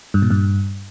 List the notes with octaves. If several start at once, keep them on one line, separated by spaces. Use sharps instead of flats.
G2
A#2
G2